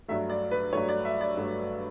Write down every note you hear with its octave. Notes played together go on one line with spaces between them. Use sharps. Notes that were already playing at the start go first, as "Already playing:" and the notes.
G2 F#3 A3 E5
D5
B4
G2 F#3 A3 C#5
D5
E5
D5
G2 F#3 A3